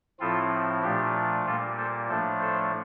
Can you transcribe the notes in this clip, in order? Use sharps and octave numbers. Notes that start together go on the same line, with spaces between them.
A2 F3 C4 E4 F4 A4
A#2 F3 A3 D4 G4
A#2 G3 A#3 F4 A4
A4 C5
A2 F3 A3 D4 A4 C5
A4 C5